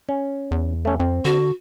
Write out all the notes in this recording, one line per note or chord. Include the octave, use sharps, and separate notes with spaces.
C#4
E2
A3 C#4
F2 C4
D3 F#4